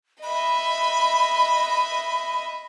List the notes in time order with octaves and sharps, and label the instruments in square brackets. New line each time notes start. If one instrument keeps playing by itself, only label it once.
[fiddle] D#5 E5 [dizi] B5